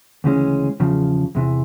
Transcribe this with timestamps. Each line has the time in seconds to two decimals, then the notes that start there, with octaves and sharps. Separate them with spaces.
0.24 D2 C#3 E3 G#3 C#4
0.80 E2 C#3 F3
1.35 E2 C3 E3